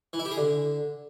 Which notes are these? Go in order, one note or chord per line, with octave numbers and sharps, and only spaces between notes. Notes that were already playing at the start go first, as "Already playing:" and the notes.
E3
E4
G4
G#4
D3